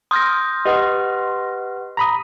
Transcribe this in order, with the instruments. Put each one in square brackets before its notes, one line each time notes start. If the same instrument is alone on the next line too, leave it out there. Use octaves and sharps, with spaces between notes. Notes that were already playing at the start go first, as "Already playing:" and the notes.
[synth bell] C6 F6 A#6 [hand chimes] D#6 G6
[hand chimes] G4 B4 F#5 [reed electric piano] D#5
[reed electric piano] A#5 B5 D#6